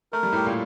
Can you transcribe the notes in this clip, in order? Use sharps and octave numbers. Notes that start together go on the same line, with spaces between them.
A3 A#4
G3
A2 A3 G4
A#2 A#3